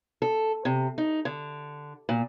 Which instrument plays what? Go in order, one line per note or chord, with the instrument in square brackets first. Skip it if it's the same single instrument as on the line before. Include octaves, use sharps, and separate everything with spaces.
[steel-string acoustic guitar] A4
C3
D#4
D3
A#2